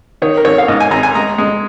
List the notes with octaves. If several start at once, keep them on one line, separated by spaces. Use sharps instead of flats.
D#3 C#5
A#4
G#1 C#5
F5
G#2 D#5
G#5
G#1 A#5
G#5
G#3 A#5
G#3